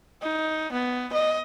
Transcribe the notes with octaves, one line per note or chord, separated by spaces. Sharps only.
D#4
B3
D#5